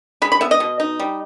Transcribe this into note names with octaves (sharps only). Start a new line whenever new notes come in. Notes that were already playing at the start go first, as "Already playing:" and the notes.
G#3 B5
B5
B3 E5
D#5
B2
D#4
G3